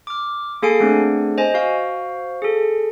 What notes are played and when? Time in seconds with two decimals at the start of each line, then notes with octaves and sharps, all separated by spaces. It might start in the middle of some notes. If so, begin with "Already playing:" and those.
0.07 D6 F6
0.62 A#3 G#4 A4 G#5 C7 D7
0.80 A3 B3 C4 D4 G#4
1.38 C5 D#5 G#5
1.54 F#4 C5 F5
2.42 G#4 A4